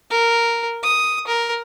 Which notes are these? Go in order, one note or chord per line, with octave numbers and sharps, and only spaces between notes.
A#4
D#6
A#4